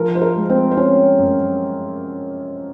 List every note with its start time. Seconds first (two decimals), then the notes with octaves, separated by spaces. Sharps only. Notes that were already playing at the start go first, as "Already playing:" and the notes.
Already playing: F3 A#4
0.15 C5
0.21 A#4
0.36 G#3
0.50 C4 C5
0.71 C5
0.77 C4 C#4 C#5
1.19 F#2